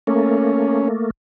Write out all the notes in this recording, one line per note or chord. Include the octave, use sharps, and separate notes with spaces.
A3 A#3 C#4